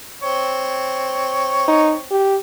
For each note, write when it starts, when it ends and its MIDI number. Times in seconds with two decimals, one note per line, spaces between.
0.23 2.09 60
0.23 2.09 73
1.68 1.95 63
2.11 2.37 67